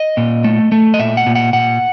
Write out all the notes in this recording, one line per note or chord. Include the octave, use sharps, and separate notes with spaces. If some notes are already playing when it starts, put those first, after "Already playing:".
Already playing: D#5
A#2
A3
A3
D#5
A#2 E5
F#5
A#2
F#5
A#2 F#5